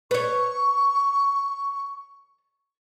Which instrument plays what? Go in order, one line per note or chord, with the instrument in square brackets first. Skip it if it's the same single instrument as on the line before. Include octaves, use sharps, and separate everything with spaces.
[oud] B4 C#5 [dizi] C#6